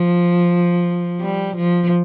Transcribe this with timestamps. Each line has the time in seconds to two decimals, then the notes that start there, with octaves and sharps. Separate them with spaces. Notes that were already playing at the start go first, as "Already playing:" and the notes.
Already playing: F3
1.20 G3
1.56 F3